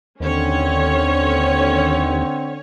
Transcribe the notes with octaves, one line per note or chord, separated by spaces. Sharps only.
D#2 D3 C4 C#4 C#5